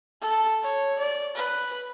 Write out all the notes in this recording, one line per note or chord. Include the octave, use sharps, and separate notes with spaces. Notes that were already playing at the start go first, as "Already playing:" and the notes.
A4
C#5
D5
B4